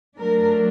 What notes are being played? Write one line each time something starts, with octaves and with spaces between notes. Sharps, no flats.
F#3 A3 D4 A#4